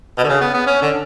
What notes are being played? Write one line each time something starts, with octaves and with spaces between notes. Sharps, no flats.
B2
D3
C#3
B3
B3
C#4
D3